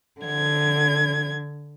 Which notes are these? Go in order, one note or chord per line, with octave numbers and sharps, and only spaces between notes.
D3 G#6